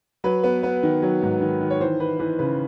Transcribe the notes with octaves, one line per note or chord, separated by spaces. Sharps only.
F#3 B4
B3
B3
D#3
F#3
G#2
D#3
D#3
C#5
E3 C5
E3 B4
E3 B4
C#3 B4